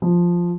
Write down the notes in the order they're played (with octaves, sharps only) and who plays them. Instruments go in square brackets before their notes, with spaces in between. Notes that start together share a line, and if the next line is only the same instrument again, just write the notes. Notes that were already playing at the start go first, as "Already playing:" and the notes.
[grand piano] F3